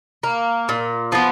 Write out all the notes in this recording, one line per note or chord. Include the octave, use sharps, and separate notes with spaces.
A#3
A#2
F3 B3